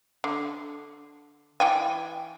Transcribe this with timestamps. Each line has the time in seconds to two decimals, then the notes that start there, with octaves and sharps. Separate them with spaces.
0.24 D3
1.60 E3 G5 G#5